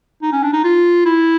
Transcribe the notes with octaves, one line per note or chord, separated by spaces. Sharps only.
D#4
C#4
D4
D#4
F4
E4